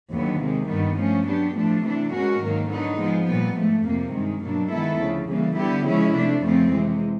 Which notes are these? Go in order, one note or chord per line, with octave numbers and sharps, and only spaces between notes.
D#2 D3 F#3 B3
C3 D#3 G#3
G2 D#3 G3 B3
F3 A3 C#4
F#3 B3 D4 G4
A2 F3 A3 D4
C3 E3 A3 D4
B2 G#3 C#4 F#4 A#4
G#2 D#3 F#3 A#3
D3 F#3 B3 D#4
F3 G#3 B3
A#2 G3 B3
G#2 F3 A3
F2 C3 F3 A#3
G2 D#3 G#3
B2 F#3 A#3 D4
D#3 G#3 B3 E4 A4
D2 C#3 F3
C#3 E3 G3 A#3
D3 G3 B3 E4 G4
C#3 F3 G#3 C#4 E4
C3 F3 A3 D4
F2 C#3 F3 A3 C4
C3 E3 G#3